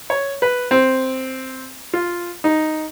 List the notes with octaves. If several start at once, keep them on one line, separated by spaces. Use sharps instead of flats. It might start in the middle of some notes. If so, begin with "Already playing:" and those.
C#5
B4
C4
F4
D#4